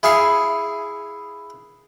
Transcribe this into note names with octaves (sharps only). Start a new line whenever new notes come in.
E4 G#4 F5 G#5 C#6